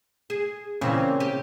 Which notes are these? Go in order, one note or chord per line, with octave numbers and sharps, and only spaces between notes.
G#4
A#2 C#3 E3 A#3 C4 C#4
G4